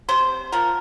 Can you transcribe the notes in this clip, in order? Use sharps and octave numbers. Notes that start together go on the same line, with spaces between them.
C3 C5
F3 A#4